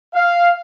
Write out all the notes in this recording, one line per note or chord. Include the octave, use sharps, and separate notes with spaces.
F5